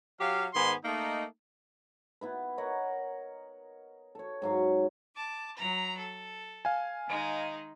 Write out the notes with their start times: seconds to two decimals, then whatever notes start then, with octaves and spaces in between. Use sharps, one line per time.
0.19 F#3 G4 F5
0.54 G#2 D#3 B3 G#5 C6
0.84 A3 A#3 D#4
2.21 B3 E4 B4
2.58 A#4 C#5 D#5 F#5
4.15 A4 C#5
4.42 G#2 F#3 F5
5.15 A5 D6
5.57 F#3 A#5 B5
5.96 A4
6.65 F5 G#5
7.07 D#3 G#3 D#4